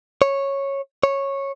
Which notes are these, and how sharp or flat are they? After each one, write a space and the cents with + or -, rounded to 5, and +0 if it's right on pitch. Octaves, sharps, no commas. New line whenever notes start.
C#5 -10
C#5 -10